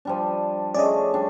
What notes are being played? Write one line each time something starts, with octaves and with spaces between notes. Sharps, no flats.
F3 G3 D4
A3 C#4 G#4 D5 D#5
G3 D4